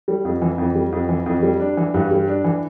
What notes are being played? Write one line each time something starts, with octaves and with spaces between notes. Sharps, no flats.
G3
F2
E3
F2
G3
F2
E3
F2
G3
D4
E3
G2
G3
D4
E3